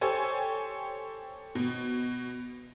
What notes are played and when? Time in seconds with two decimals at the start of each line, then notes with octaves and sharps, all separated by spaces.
0.01 G4 A4 C5 C#5 G#5
1.55 B2